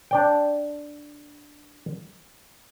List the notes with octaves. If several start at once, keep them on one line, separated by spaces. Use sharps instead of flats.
D4 D5 G5